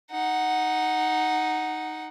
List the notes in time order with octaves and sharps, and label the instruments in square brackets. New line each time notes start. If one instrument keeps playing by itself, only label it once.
[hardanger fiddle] D#4 F#5